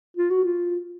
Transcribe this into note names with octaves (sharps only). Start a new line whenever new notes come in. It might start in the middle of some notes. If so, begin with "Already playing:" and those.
F4
F#4
F4